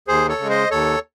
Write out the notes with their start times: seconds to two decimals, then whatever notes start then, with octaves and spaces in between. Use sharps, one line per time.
0.08 D#2 G#4 C5
0.29 A4 C#5
0.39 C#3 G#3
0.49 C5 D#5
0.71 D#2 A4 C#5